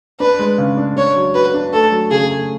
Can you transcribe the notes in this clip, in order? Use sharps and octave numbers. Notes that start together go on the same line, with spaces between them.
D4 B4
G#3
C#3
D4
D4 C#5
F#3
F#4 B4
D4
A3 A4
F#3
C#3 G#4
A3